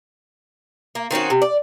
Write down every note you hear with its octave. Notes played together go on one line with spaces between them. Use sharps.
A#3
D#3 C4 C#4 F#4
C3
D5